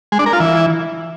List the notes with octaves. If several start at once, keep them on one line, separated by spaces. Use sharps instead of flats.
G#3
D4
A#4
F4
E3